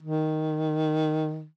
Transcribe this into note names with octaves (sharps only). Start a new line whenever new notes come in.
D#3